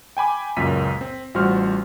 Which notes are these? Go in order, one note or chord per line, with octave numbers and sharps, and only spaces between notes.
G5 G#5 B5 D6
C#2 F#2 A#2 B6 D#7
C4
A1 G3 F4 F#4 C5 F6